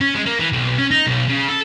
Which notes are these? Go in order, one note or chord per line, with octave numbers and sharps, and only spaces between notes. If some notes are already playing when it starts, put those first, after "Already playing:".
C#4
G#3
A#3
E3
B1
C#4
D#4
B1
C#3
A4